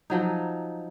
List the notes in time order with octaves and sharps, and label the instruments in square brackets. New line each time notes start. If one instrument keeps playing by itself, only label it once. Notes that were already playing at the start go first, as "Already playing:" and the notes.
[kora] F3 F#3 D#4